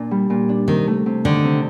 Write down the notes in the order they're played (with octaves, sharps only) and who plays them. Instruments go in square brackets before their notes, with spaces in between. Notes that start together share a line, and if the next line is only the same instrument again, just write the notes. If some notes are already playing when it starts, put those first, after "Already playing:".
Already playing: [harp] A#2 D4
G3
A#2
D4
[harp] C3 [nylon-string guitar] D#3
[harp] A3
C3
[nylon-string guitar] D3 [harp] D#3
[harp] C3